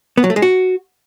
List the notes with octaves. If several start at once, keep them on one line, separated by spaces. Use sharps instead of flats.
B3
F#3
A3
G#3
F#4